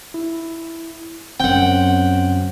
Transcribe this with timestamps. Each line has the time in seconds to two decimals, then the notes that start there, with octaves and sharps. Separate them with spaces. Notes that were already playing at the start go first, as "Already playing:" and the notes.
0.14 E4
1.40 F#2 C4 F#5 G5